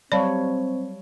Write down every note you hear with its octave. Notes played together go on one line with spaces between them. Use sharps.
F#3 G3 C4 C#5 D5 F5 A5 B5